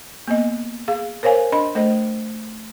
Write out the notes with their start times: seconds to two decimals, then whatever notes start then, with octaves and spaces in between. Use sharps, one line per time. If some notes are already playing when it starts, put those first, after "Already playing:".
0.28 A#3 B3 D#5
0.88 G#4 F5
1.23 A#4 C5 C#5 F5 G#5
1.52 D4 D#5 B5
1.75 A3 C5 D#5